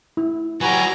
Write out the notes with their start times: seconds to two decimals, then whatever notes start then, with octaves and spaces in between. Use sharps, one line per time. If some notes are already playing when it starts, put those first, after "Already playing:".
0.17 E4
0.61 F#3 F#4 G4 B4 G#5 A#5